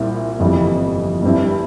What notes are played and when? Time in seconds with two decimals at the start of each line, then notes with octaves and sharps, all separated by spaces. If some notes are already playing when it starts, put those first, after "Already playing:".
Already playing: C2 A#2 C4 E4
0.40 G1 F2 E3 G3
1.23 G2 G3 C4 E4